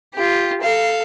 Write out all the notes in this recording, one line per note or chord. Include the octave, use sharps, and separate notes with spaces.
F4 G4
A4 F5